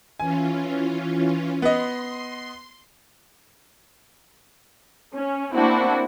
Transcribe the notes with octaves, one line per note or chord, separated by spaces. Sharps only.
E3 C#4 F4 G#5
B3 D#5 C6
C#4
A#3 C4 D4 E4 F#4